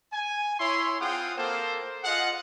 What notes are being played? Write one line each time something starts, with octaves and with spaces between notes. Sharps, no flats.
G#5
E4 C#5 C6
C4 F4 G#4 F#5 G5 D#6
A#3 A4 C5
F4 G#4 D#5 F5 F#5